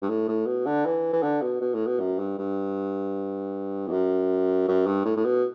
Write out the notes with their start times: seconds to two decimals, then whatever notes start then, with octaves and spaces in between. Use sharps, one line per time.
0.02 G2
0.09 A2
0.28 A2
0.46 B2
0.66 D3
0.85 E3
1.13 E3
1.23 D3
1.42 B2
1.61 B2
1.74 A2
1.87 B2
1.99 F#2
2.19 G2
2.38 G2
3.87 E2
3.91 F#2
4.68 F#2
4.86 G2
5.05 A2
5.16 A2
5.25 B2